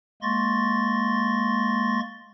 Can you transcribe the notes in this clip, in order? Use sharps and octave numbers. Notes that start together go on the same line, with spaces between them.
G#3 A#3 C6 C#6 A6 A#6